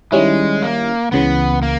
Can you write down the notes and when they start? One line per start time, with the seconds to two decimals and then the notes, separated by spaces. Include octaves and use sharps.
0.12 D#3 G3 G#3 C#4 E4
0.62 A#3
1.12 C#2 C#3 E3 B3
1.62 A#3